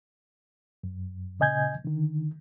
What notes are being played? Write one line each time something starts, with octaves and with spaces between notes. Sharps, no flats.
F#2
A#2 C#3 D#5 G#5 G6 G#6
D3 D#3